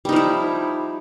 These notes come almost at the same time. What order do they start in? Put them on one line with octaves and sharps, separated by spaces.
G3 D#4 F3 E4